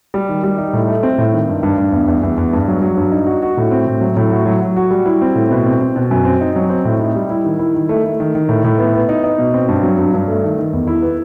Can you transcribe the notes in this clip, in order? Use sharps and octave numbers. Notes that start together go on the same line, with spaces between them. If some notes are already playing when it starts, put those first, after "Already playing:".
G3
D#3
G3
D#4
A2
A3
C4
A2
D#3
G2
G2
G2
E2
E2
E2
E2
G2
F#3
F#3
G2
D#4
F#4
F#4
A2
C4
A2
F#3
A2
F#4
F#3
F#3
F#4
G3
E4
C4
A2
B2
C4
C4
B2
F#2
C4
D#4
F#3
C4
A2
D#4
G3
E4
D#3
E4
D#3
A3
A3
D#3
D#3
A2
A2
B3
B3
D#4
D#4
B2
C4
G2
F#3
G2
G2
A3
D#3
D#3
E2
E4
B3